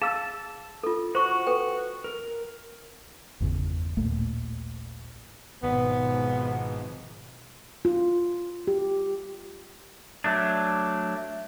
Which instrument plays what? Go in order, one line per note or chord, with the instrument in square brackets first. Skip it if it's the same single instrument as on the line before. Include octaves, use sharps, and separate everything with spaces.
[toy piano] G#4 F5 [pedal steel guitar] A5 E6
[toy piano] F4 A4
[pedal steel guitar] F#4 [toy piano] C5 C#6
[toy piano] A4 B4 G5
[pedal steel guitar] A#4
[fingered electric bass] G1 E2 C#3
A1 D#2 A#2 A3
[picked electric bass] G#1 [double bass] B2 F3 [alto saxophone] B3
[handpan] F4
G4
[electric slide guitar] F#3 A3 D4